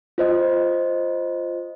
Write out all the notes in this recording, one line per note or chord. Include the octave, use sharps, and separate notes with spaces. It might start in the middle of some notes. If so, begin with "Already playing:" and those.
F4 C5 D#5